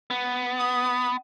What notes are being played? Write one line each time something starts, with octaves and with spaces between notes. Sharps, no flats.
B3
D#6